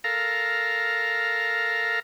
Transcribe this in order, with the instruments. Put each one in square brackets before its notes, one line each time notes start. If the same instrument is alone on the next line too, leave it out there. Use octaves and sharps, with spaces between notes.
[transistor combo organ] A4 A#4 F5 A#5